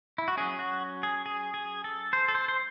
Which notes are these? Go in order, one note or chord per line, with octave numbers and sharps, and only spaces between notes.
E4
F#4
F#3 C#4 G#4
F#4
G#4
G#4
G#4
A4
C5
A4
C5
C5